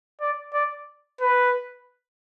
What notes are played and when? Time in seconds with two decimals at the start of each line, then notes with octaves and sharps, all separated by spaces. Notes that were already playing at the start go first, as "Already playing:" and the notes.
0.21 D5
0.53 D5
1.21 B4